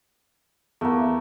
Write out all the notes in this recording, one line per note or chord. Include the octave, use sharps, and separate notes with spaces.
E2 A3 A#3